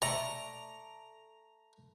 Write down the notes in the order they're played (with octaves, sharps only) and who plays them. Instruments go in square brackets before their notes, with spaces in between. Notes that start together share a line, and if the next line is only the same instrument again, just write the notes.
[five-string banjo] A3 D5 [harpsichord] A#5